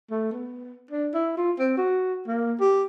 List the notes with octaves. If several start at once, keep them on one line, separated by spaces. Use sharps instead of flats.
A3
B3
D4
E4
F4
C4
F#4
A#3
G4